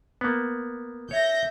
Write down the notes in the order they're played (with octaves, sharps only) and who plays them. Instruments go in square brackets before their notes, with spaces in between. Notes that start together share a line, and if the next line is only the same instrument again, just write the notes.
[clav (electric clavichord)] A#3 B3
[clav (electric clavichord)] C#5 [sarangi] E5 [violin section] G6 A#6